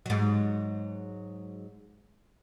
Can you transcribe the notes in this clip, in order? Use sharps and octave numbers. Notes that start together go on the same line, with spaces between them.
G#2 F#3